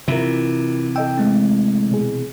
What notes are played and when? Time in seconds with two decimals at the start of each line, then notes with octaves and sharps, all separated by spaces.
0.08 C3 E3 E4 F4 A#4
0.96 A4 D#5 G5 E6
1.18 G#3 A3 C4
1.91 B2 G#4